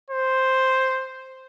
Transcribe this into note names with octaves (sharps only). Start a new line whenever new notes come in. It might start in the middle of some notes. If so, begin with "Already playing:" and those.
C5